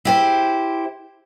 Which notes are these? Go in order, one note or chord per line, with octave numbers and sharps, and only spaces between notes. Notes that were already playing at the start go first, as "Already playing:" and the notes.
E4 G4 C5